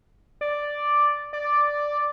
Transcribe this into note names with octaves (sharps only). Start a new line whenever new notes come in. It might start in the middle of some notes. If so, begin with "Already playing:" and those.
D5
D5